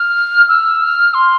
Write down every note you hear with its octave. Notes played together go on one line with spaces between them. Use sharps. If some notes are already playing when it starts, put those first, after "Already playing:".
Already playing: F6
E6
F6
C6